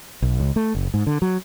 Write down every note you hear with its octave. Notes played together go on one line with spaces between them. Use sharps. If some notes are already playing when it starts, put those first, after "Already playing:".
B1
C#2
A3
F#1
G#2
D3
F#3